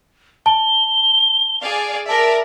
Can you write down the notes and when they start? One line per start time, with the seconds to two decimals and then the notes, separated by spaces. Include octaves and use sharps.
0.46 A5 G7
1.61 G#4 D5 F5
2.08 A#4 D5 E5 A5